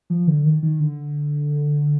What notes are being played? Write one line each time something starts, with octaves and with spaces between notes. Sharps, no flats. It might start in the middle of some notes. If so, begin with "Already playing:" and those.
F3
D3
D#3
D#3
D3